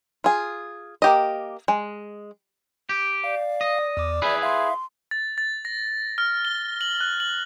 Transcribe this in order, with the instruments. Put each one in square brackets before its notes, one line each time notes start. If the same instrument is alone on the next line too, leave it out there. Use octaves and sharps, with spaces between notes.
[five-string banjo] F4 G#4
A#3 G4 D#5
G#3
[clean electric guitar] G4
[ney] D5 [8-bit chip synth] F5
[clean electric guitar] D#5
[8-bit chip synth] E2 D6
[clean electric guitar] E4 G#4 B4 [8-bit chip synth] E5 B5
[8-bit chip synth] E5 F5 [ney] C6
[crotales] A6
A6
A#6
F6
G7
F#7
F#6
F#7